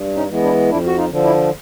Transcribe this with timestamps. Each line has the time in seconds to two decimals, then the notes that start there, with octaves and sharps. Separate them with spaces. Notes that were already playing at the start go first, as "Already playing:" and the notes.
Already playing: G2
0.16 C#4 D#4
0.29 E3 G#3 B3
0.42 D4 E4
0.69 F2 D4 E4
0.86 F#4
0.97 D#4 F4
1.10 D3 F3
1.23 D4 E4